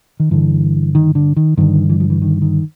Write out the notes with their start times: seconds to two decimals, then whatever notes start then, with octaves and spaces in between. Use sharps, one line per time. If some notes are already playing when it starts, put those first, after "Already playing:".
0.20 D#3
0.31 G2 D3 E3
0.95 D#3
1.15 D3
1.37 D#3
1.57 G2 D3 D#3
1.90 E3
2.00 F3
2.10 E3
2.22 D#3
2.42 D#3